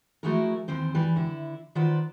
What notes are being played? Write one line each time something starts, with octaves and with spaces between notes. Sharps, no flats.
F3 A3 E4 F#4 G#4 A#4
D#2 E3 C4 C5
E3 G3 B4
D3 E4
D#3 F4 B4 C5 D5 F#5